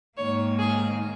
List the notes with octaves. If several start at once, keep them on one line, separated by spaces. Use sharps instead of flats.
G#2 D#3 A#3 C#5
G#4